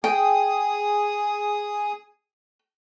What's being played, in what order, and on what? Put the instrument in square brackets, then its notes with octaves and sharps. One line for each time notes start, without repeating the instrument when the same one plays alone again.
[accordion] G#4 D#6 [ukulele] G5